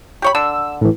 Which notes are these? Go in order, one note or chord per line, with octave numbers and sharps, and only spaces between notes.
G4 C#5 B5
D3 E6
A2 E3